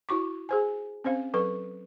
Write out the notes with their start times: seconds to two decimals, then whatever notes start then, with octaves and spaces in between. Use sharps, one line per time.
0.09 E4 F#4 C#6 D6
0.49 G#4 C5 G#5
1.04 C4 C#4 C5 F5
1.34 F#3 A4 B4 C#6